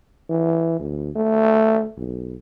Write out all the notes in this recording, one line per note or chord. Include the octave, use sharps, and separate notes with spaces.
E3
D2
A3
B1